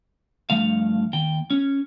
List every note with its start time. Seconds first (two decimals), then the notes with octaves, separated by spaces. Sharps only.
0.50 G2 F3 A3 F5
1.13 D#2 G5
1.50 C#4